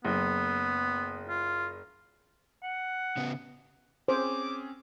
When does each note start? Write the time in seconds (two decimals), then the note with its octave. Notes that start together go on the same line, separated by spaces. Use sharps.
0.05 F#1 B3
1.28 F4
2.63 F#5
3.17 C#3 B3
4.08 C4 C#4 G#4 C5 D6